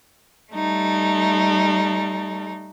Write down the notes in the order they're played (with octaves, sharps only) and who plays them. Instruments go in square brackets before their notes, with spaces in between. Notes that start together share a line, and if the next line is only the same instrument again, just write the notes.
[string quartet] G3 A3 D#4